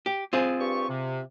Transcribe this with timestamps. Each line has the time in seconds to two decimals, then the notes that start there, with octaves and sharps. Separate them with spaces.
0.06 G4
0.33 C4 F4 G#4
0.59 G2 G4 C#6
0.88 C3